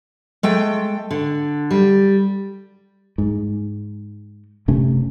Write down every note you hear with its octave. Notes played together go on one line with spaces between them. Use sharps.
G#3 A3 G5
D3
G3
G#2
F#1 C3 A3 C#4